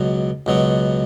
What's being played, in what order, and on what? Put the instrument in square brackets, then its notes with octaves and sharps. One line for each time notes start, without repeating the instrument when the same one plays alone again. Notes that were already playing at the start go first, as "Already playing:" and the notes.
Already playing: [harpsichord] C#2 B2 F#3 B3
C#2 B2 F#3 B3